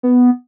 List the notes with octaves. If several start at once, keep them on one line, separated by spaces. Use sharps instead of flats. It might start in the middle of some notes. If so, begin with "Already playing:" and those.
B3